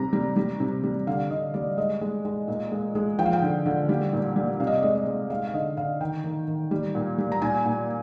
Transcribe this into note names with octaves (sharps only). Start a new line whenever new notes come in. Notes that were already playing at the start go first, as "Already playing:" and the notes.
Already playing: C3 G3 A#5
G3
G3
C3
G3
D3 F5
D3 D#5
G3 D5
G#3 D#5
G#3
G#3
A#2
G#3
G#3
F3 G5
F5
G5
D3
D3
G3
A#2
G3
C3 F5
D#5
D5
G#3 D#5
D#5
G#3
G#3 F5
F5
D3 D#5
D3 F5
D#3 G5
D#3
D#3
G3
A#2
G3
A#5
A#2 G#5
A#2